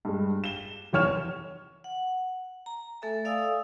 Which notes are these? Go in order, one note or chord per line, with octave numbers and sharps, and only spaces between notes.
G2 G#3
E7 G7
F1 E2 C#5 F6 E7
F#5
A#5
A3 A4 E5 G#5
A4 D5 F5 G#5 D#6 E6